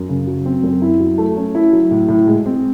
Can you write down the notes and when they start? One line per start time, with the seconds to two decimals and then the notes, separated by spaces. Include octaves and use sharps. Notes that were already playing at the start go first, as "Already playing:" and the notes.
Already playing: F#2
0.09 C#3
0.27 F#3
0.46 C4
0.63 F#2
0.82 E4
1.00 F#3
1.18 A3
1.36 C#4
1.55 E4
1.73 F#3
1.91 A2
2.09 A2
2.28 G#3
2.46 C4